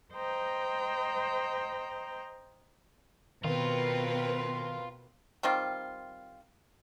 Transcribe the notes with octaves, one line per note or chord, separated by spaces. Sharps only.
C5 D#5 G5 A#5
B2 D#3 C4 F4 A#4 B4
D#3 G3 C4 F4